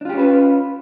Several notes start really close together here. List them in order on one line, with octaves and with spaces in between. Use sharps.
D4 F4 G4 C#4 B4